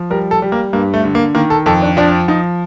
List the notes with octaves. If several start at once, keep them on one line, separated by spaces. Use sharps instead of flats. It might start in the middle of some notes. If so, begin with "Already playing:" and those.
Already playing: F3
G3 A#4
A4
G3
A#3
G2 A#3
A3
D3
A#3
D#3 A#3
A4
F2 A4
D4
F3 D4
F3 D#4